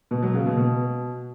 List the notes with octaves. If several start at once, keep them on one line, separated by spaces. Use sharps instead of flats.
B2
F#3
C#3
B2
B2